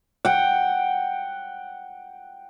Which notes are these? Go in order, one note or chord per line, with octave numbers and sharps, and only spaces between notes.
F#5 G5